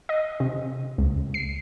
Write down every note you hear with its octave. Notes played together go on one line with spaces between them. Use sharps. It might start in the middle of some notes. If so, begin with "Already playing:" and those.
D#5
C3
C#2
C7